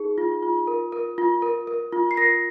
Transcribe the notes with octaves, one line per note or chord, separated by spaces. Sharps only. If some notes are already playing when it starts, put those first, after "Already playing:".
Already playing: D#4 G#4
F4
F4
A#4
A#4
F4
A#4
A#4
F4
C7
A#4 A#6